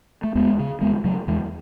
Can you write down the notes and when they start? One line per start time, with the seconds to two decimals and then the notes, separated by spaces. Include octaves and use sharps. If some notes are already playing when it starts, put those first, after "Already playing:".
0.24 A3
0.35 D#2 G#3 B3
0.59 C#3
0.81 D#2 G#3 B3
1.04 C#3 F#3 A3
1.27 E2 E3 G#3